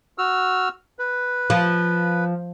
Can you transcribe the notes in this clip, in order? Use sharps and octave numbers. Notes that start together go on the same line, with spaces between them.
F#4 E6 F6
B4
F3